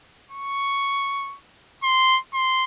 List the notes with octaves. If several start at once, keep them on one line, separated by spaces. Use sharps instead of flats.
C#6
C6
C6